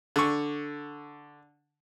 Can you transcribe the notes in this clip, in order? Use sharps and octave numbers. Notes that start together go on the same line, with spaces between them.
D3 C#6